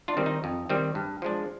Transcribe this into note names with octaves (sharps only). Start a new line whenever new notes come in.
D4 F4
D#3 G3 C4
D#4
F2
D#3 G3 C4
G2
F3 G#3 D4